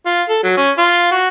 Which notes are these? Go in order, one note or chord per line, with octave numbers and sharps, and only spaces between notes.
F4
A4
F#3
C#4
F4
F#4